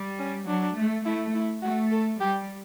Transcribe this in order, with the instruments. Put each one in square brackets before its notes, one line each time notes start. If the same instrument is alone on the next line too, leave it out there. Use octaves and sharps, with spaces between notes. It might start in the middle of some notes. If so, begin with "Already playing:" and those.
Already playing: [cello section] G3
[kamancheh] C#4
[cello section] F#3 [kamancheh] D4
[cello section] A3
[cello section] A3 [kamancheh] E4
[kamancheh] E4
[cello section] A3 [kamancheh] F#4
[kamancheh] A4
[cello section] G3 [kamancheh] G4